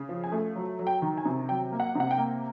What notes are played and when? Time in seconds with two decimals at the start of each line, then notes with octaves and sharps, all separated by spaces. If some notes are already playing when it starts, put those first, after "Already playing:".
Already playing: C#3
0.09 F3
0.24 G#5
0.32 A3
0.56 F#3
0.79 F#3
0.87 G5
1.02 D#3
1.17 G#5
1.25 C3
1.49 F#3 G5
1.72 A#3
1.80 F#5
1.95 C3 F#5
2.11 G5
2.18 A#3